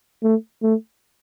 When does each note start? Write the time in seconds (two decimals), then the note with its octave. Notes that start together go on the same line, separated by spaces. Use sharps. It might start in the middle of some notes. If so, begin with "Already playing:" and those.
0.23 A3
0.63 A3